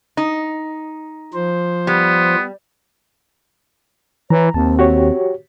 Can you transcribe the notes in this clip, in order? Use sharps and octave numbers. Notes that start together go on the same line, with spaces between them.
D#4
F3 C5
G3 B3
E3 C#5 A#5
D#2 C4 A5
F#4 G4 C#5